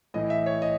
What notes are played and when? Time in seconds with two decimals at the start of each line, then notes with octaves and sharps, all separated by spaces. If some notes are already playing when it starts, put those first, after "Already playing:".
0.14 A2 E3 D#5
0.30 E5
0.46 C#5
0.62 D#5